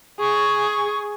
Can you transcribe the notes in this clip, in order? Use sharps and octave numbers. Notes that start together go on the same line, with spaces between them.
G#4 C#6